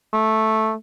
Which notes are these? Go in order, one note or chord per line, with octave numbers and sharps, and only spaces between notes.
A3